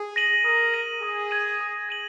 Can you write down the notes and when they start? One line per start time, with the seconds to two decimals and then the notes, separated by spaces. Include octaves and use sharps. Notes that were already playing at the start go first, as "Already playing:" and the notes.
Already playing: G#4
0.16 A#6 D#7 F#7
0.45 A#4 D#6
0.74 A#6 D#7 F#7
1.02 G#4 D#6
1.31 G#6 D#7 F#7
1.61 D#6
1.89 G#6 D#7 F#7